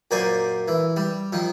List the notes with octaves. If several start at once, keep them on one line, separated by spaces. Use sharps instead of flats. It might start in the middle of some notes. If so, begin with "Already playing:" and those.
F#2 A#2 A#3 C5 D5 G#5
E3
G3
D#3 F3